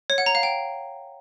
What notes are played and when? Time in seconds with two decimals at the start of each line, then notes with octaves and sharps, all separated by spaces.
0.10 C#5
0.18 F#5
0.26 A#5
0.35 F5
0.43 G5